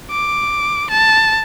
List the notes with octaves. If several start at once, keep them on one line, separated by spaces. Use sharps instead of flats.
D6
A5